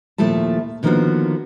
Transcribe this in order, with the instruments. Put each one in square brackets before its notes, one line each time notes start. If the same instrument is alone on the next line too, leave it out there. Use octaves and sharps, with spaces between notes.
[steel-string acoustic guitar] D#2 A#2 F3 A3 E4 A5
D3 D#3 F3 A#3 B3 F#4